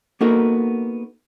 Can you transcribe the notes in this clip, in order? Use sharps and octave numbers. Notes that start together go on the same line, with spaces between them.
A#3 B3 D#4 F#4 A4 A#4